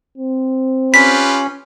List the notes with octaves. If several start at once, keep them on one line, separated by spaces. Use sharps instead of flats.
C4
C#4 F4 G4 B4 B6